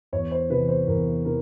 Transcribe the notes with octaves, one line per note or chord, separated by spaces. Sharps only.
E2 C#5
C5
C3 E3 B4
C5
E2 A#4
C3 E3 A#4